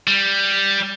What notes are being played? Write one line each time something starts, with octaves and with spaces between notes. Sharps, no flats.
G3